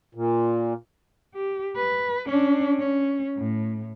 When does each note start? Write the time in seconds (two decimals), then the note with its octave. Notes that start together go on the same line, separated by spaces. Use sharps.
0.15 A#2
1.35 G4
1.76 B4
2.26 C#4 D4
2.79 C#4
3.37 A2